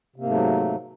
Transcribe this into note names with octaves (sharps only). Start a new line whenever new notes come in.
G#2 C3 F#3 A3 A#3